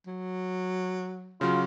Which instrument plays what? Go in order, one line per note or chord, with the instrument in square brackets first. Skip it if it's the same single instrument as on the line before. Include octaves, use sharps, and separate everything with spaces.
[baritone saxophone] F#3
[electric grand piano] C#3 F#3 [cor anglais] F4